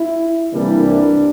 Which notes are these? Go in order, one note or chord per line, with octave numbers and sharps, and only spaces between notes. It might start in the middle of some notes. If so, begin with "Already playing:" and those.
Already playing: E4
C2 C3 E3 G3 A#3 D4